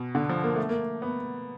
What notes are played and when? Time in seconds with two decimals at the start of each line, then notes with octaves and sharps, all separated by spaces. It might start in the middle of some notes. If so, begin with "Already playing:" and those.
Already playing: B2
0.15 D3
0.29 F3
0.44 A#3
0.56 A3
0.69 A#3
1.02 B3